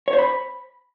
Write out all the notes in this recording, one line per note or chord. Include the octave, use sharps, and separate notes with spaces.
C#5
C5
B5